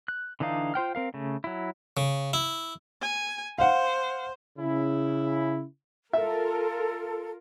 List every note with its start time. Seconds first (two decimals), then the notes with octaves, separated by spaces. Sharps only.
0.08 F#6
0.40 D3 E3 D4 D#4 F5
0.74 F4 C5 G5 F6
0.95 C4 A#4 F5
1.14 C#3 A3
1.44 F#3 E4
1.97 C#3
2.33 E4
3.02 G#5
3.58 C5 F5 F#5
4.59 C#3 E4
6.13 F4 A4 A#4 E5